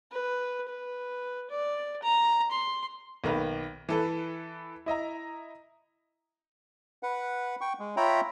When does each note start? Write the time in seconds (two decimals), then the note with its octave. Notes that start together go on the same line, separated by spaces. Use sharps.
0.11 B4
0.68 B4
1.50 D5
2.02 A#5
2.51 C6
3.24 B1 D#3 A#3 B4
3.89 E3 A4 B4
4.86 E4 D#5 E5 A#5
7.03 B4 F#5
7.61 G5 C#6
7.79 G#3
7.97 F4 C#5 E5 G5 A#5 B5